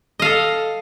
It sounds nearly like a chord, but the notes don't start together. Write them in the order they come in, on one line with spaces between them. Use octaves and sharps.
D#5 F5 A4